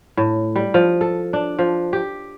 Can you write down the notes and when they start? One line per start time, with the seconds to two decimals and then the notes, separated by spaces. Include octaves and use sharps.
0.17 A2
0.56 G3
0.74 F3
1.01 A4
1.33 D4
1.59 F3
1.93 G4